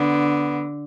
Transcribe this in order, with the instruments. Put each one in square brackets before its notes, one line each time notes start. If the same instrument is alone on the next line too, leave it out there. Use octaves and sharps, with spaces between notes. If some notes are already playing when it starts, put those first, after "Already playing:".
Already playing: [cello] D3 [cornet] B3